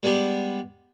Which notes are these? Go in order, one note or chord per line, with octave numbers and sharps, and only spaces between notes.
G3 G#3 B3 D4 G4